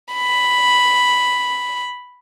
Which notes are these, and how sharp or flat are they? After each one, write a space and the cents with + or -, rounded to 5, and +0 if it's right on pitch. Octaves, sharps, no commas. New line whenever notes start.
B5 +0